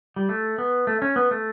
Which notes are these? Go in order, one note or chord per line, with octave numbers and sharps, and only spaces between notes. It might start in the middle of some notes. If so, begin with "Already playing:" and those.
G3
A3
B3
A3
C#4
B3
A3